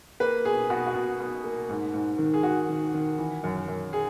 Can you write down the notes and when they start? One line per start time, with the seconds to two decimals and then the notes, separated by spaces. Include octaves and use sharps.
0.20 A#3 B4
0.45 B2 G#4
0.70 B2 F#4
0.86 F#4
0.94 B2
1.20 B2
1.44 A#3
1.69 G#2
1.94 G#2
2.18 D#3
2.34 G#4
2.43 D#3 F#4
2.69 D#3
2.94 D#3
3.18 E3
3.44 F#2
3.68 F#2
3.93 G#4